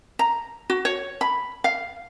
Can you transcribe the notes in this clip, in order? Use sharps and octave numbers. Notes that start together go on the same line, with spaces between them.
A#5
F#4
C#5
B5
F5